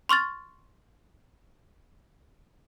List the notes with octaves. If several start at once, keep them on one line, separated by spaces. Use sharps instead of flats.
C6 C#6 F6 A6